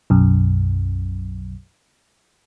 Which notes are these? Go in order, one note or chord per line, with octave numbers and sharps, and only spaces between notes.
B1 F#2